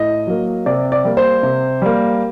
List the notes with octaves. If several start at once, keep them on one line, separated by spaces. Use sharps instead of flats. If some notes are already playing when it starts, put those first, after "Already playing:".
Already playing: A2 D#5
F#3 A#3
C3 D5
D5
G3 A#3
C5
C3
G3 A#3